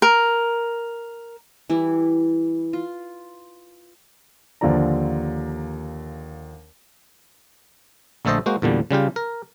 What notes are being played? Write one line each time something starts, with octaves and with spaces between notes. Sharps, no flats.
A#4
E3 G3 E4
F4
D#2 D3 F3 D5 A#5
A#1 D3 A3 A4 C5 D#5
G#3 A#3 F#4 C5
E2 A#2 D3 G3
C#3 G3 F4 G4
A#4